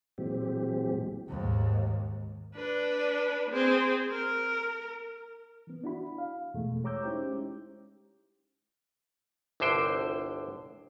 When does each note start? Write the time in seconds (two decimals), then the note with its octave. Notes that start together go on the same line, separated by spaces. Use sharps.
0.18 A#2 E3 F#3 G#3 C4 G4
1.28 D#2 G#2
2.55 D4 B4
3.50 C4 G#4
4.12 A#4
5.67 E3 B3
5.84 D4 E4 F#4 B5
6.18 F5
6.54 E2 B2 E3 G#3 A3
6.84 G4 C#5 A#5 D6 E6 G6
7.03 G#3 C#4 D#4 E4 G4 C5
9.60 G1 C2 D3 C5 G5